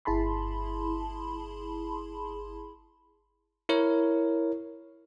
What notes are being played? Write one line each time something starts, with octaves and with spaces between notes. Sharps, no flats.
G1 E4 G#4 A5 B5 C6
E4 A#4 C#5